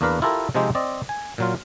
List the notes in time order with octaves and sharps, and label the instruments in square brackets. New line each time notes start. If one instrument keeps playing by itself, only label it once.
[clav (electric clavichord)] E2 A#3 D4 A#4 B4 F5
E4 F4 G4 A4 A#4
C3 F3 G#3 C4 D#4 G4
C4 D5 D#5
G#5
A#2 F#3 F4